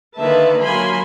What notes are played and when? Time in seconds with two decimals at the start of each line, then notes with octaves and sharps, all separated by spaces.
0.19 D3 D#3 A#3 B4 E5 A5
0.61 F#3 A#3 G#5 B5 C6